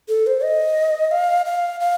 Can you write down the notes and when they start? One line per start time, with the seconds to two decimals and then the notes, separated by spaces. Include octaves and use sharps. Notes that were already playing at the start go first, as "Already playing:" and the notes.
0.09 A4
0.27 C5
0.43 D#5
1.11 F5
1.46 F5
1.80 F5